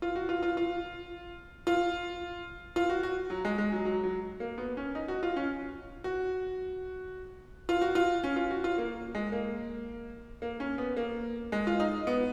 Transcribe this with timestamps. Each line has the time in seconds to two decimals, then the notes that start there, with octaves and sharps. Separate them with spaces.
0.02 F4
0.16 F#4
0.29 F4
0.43 F4
0.57 F4
1.67 F4
2.76 F4
2.89 F#4
3.03 F#4
3.30 F#3
3.45 G#3
3.58 G#3
3.72 F#3
3.85 F#3
4.03 F#3
4.40 A#3
4.58 B3
4.77 C#4
4.95 D#4
5.08 F#4
5.23 F4
5.36 C#4
6.04 F#4
7.69 F4
7.81 F#4
7.95 F4
8.24 C#4
8.36 F4
8.51 F#4
8.64 F4
8.78 A#3
9.15 G#3
9.32 A#3
10.42 A#3
10.60 C#4
10.78 B3
10.97 A#3
11.52 G#3
11.67 F4
11.80 D#4
12.07 B3